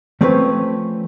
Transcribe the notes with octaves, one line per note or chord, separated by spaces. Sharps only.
F3 A3 C4 C#4 B4 C#5